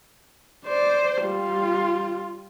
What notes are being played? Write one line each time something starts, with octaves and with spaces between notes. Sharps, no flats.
C5 D5
G3 F4